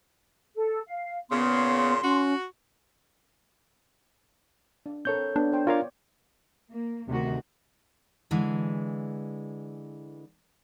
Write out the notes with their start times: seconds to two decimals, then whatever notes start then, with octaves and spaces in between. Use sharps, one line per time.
0.55 A4
0.88 F5
1.30 A#2 C#3 B3 C6
2.03 C#4 F#4
4.86 D4
5.05 C4 A4 A#4 C#5 G6
5.36 B3 D4
5.53 C5 G5
5.67 F4 A#4 C#5 D5 F5
6.69 A#3
7.08 D2 C3 D#3 F#4
8.31 D3 E3 G#3